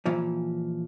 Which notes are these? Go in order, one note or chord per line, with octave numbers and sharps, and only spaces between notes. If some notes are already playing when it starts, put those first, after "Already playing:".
A#2 E3 F3